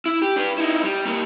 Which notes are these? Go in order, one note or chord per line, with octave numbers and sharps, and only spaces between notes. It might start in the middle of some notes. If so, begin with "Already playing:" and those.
E4
G4
D4 B4
D#4 E4
G3
A#3 G4